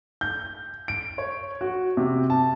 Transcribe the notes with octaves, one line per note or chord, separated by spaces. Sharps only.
G6
D7
C#5
F#4
C3
A5